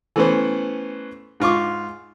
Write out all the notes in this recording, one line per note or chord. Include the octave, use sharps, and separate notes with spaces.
E3 A3 B3 C#4 B4 C5
G#2 F4 C#6 D6